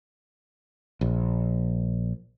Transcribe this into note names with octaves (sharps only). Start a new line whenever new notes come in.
A#1